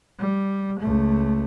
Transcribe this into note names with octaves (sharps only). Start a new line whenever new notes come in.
G3
C#2 A3